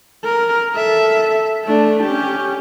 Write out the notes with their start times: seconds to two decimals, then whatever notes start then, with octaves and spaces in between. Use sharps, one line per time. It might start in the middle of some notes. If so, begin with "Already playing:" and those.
0.24 A#4
0.74 A4 E5
1.65 A3 D4
2.03 C#4 G4